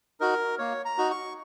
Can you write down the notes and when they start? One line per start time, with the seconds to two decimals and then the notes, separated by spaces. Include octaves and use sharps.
0.20 D#4 F#4 A#4
0.59 A#3 C#5
0.85 A#5
0.98 D#4 F#4
1.11 C#6